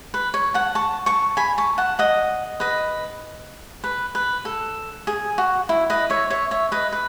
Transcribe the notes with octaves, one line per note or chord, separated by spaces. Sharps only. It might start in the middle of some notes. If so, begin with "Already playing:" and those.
B4
C#5
F#5 A5
A5 C#6
A5 C#6
G#5 B5
A5 C#6
F#5 A5
D#5 F#5
B4 D#5
B4
B4
A4
G#4
F#4
E4
B4 D#5
C#5 E5
C#5 E5
C#5 E5
B4 D#5
B4